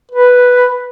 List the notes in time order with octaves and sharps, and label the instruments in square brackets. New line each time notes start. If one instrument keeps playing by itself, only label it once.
[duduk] B4